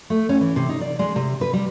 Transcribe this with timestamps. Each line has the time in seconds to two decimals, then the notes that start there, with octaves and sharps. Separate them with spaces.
0.10 A3
0.29 C#4
0.41 E3
0.56 C3
0.69 D#4
0.81 D5
0.99 G#3
1.16 C3
1.41 B4
1.53 G3